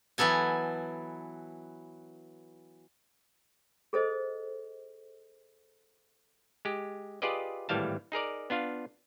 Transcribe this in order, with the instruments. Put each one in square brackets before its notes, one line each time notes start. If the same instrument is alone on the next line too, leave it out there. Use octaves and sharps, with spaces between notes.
[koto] E3 F#3 B3 A4 G#5
[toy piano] G#4 A4 C5 D#5
[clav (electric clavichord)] G#3 G4
F4 G4 G#4 B4 D5 D#5
G#1 A2 E3 G3 F5 A5
D#4 G#4 A#4 D5
B3 D4 F4 F5